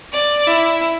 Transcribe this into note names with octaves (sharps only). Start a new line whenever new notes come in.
D5
E4